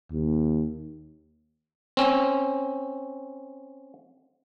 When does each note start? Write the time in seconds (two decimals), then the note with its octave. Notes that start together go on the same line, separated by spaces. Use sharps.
0.12 D#2
1.97 C4 C#4